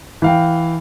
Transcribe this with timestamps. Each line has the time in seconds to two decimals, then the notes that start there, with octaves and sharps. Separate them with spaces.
0.22 E3 F5 G5